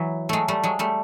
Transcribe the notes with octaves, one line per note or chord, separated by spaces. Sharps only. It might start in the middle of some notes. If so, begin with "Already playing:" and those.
Already playing: E3 F#3
F#3 G#3 A3
G3 A3
F#3 G#3
G3 A3